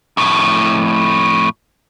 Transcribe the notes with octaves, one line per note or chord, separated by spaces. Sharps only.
F2 A2